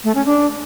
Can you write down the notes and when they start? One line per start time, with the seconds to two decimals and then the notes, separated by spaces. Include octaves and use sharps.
0.04 A3
0.15 C#4
0.26 D4